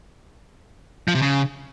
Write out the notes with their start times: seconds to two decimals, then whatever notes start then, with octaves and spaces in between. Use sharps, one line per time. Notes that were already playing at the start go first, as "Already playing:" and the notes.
1.08 F3
1.15 C3
1.22 C#3